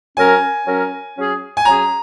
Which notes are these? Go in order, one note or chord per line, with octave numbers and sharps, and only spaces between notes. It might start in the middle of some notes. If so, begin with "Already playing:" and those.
F#3 C#4 A#4 G#5
F#3 C#4 A#4
F#3 C#4 G#4
G#5
F#3 C#4 G#4 A#5